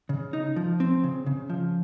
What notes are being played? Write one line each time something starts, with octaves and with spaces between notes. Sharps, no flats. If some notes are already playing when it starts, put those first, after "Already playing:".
C#3
D#4
F3
C4
C#3
C#3
F3